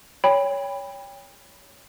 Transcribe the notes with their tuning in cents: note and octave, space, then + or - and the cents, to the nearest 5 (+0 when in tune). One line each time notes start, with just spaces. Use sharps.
C#5 +20 G5 +30 B5 +0